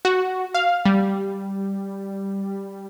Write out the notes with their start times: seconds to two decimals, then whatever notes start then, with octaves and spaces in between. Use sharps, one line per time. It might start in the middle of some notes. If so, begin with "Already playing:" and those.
0.05 F#4
0.54 F5
0.85 G3